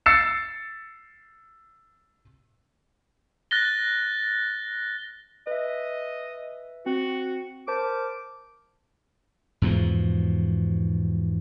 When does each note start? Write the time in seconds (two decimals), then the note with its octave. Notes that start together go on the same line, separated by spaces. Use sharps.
0.06 E6 A6 C7 C#7 E7
3.51 F#6 A6 A#6 G7
5.47 B4 D#5 E5
6.86 C4 F#4
7.68 A#4 C5 A5 D6
9.62 E2 G#2 B2 F3